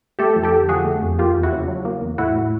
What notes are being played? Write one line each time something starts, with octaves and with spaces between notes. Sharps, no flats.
A3 G4 A4
F2
G4 A4
D3
F3 F#4 G#4
A3
F2
A#3 F4 G4
E2
E4 F#4
C#3
F#3
A#3
E2
A2 E4 F#4
A2